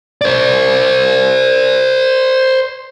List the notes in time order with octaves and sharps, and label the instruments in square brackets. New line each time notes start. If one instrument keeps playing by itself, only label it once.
[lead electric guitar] C5 D5